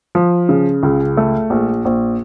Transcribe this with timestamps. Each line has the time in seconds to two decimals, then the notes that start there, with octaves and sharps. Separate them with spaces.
0.15 F3
0.49 C#3
0.83 C#2
1.17 A3
1.50 A#1
1.85 A#1